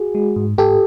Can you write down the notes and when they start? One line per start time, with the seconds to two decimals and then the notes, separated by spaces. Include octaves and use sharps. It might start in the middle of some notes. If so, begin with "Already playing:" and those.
Already playing: F#4 G#4
0.15 G#3
0.36 G#2
0.58 G#2 G4 A4